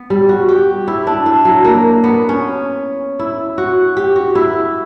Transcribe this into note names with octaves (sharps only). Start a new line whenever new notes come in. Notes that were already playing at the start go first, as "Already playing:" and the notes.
Already playing: B3
G3
F#4
G4
E4
D4
E4
F#3
A#3
B3
C#4
E4
F#4
G4
F#4
E4